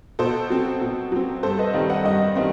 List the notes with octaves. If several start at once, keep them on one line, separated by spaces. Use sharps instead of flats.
B2 A4 C5
F#3 C4
B2
F#3 C4
G2 A4 C5
B4 D#5
D#3 G3 C4
D#5 F#5
G2 D#5 F#5
D#3 G3 C4